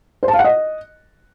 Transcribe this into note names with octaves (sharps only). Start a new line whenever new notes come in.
C5
A5
F5
F#5
D#5